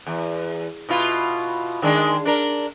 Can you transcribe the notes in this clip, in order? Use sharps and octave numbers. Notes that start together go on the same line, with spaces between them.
E2
B2 E4 F4
D#3 G#3 D4
D4 A#4